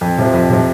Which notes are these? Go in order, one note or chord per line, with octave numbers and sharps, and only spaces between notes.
F2
C3 F3
F2
C3 F3